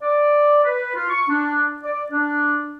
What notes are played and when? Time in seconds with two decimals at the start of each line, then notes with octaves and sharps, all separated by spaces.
0.01 D5
0.64 B4
0.94 F4
1.09 C#6
1.28 D4
1.83 D5
2.11 D4